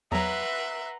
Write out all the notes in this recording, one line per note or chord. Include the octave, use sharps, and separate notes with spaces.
E2 F#3 B4 E5 F#5 A#5 C6